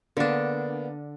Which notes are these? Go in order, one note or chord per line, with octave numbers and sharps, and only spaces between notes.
D3 A#3 B3 D4